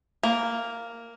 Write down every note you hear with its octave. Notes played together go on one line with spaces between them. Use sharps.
A#3